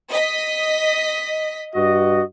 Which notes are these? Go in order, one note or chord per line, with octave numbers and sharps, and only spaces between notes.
D#5 B6
G2 F#4 D#5